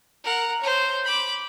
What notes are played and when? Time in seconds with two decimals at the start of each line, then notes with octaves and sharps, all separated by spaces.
0.24 A#4 F#5
0.61 C5 C#5
1.04 B5 D6